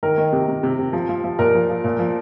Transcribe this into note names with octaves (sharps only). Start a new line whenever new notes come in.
D#3 A#4
D#3
C3
C3
C3
C3
F3
F3
F3
A#2 A#4
F3
F3
A#2
F3